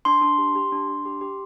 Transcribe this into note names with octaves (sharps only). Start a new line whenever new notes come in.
D4 C6
D4
G4
G4
D4
D4
G4
G4